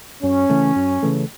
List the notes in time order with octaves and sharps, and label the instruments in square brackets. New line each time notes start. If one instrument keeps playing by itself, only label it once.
[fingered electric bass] F#2 [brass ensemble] C#4
[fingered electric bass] C#3 E3 A3
F#2
C#3 E3 A3